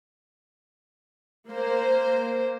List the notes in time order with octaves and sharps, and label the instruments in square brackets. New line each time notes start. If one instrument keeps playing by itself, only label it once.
[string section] A#3 C5